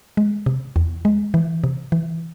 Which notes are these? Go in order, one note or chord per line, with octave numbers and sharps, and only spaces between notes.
G#3
C3
E2
G#3
E3
C3
E3